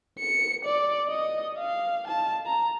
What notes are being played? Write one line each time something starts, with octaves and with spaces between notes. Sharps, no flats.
C#7
D5
D#5
F5
A5
A#5